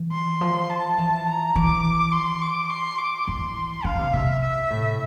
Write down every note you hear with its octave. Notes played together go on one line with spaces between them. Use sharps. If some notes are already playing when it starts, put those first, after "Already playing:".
Already playing: E3
C6
F3
A5
E3
A#5
E3 D6
C6
D6
C6
D6
E3 C6
D3 F5
C3
C3 E5
E5
A2